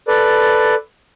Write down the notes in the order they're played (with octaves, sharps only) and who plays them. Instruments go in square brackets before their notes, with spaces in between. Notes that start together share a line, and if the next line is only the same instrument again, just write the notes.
[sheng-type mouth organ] A4 B4 D5